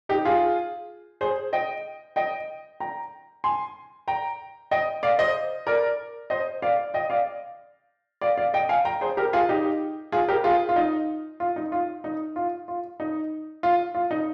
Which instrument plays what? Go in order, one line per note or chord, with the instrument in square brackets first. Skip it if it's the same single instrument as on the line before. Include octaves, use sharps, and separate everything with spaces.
[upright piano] D#4 G4
F4 G#4
G#4 C5
D#5 G5
D#5 G5
G5 A#5
G#5 C6
G5 A#5
D#5 G5
D5 F5
C5 D#5
A#4 D5
C5 D#5
D5 F5
D#5 G5
D5 F5
D5 F5
D5 F5
D#5 G5
F5 G#5
G5 A#5
G#4 C5
G4 A#4
F4 G#4
D#4 G4
F4 G#4
G4 A#4
F4 G#4
F4
D#4
F4
D#4
F4
D#4
F4
F4
D#4
F4
F4
D#4